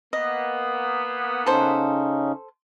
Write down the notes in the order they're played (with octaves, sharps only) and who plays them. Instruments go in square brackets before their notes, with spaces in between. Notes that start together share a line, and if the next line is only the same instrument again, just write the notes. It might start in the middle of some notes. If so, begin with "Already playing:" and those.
[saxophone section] A#3 B3 [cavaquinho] D#5
[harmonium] C#3 C#4 D#4 [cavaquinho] A4 C5